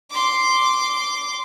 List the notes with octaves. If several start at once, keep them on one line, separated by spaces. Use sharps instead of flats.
C6 D6